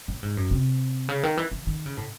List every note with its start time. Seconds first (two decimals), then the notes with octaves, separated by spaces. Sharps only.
0.08 A2
0.23 G#2
0.37 F#2
0.51 C3
1.09 C#3
1.23 D#3
1.37 E3
1.51 E3
1.67 D#3
1.86 C#3
1.97 A2